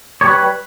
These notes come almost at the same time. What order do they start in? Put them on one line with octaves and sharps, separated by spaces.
C#5 G3 B4